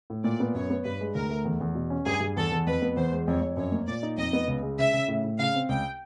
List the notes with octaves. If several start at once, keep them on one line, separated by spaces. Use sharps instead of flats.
A2
A#2 D5
B3
F#2 C#5
B3
G2 B4
G#3
D2 A#4
A3
E2
E2
B2
C#4
G2 G#4
G2
E2 A4
E2
F2 B4
B3
E2 C5
G#3
F2 C#5
F2
F#2 C#5
A#3
A#2 D5
D#4
F2 D#5
B3
C#2
G#3
C#3 E5
C#3
A2
A2
C#3 F5
C4
C#2 G5